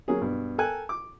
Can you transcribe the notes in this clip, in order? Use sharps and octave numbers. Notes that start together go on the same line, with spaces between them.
F#3 A#3 C#4 G#4
G2 B2
A4 A#4 G5 G#5 F#6
D6